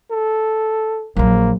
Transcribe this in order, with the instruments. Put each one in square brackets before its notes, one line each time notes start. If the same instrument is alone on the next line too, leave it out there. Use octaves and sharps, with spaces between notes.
[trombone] A4
[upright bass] A#1 F#3 [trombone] A#3